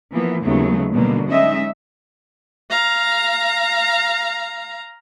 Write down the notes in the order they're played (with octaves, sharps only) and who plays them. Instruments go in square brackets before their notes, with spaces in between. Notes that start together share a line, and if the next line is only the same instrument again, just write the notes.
[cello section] E3 F3 A#3 B3
D#2 C#3 F#3 G#3 A3 B3
B2 D3 F#3 G3 A#3
G#3 C#4 D#4 D#5 E5
[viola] F5 A#5